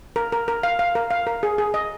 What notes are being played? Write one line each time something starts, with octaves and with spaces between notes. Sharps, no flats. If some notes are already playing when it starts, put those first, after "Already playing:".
A#4
A#4
A#4
F5
F5
A#4
F5
A#4
G#4
G#4
D#5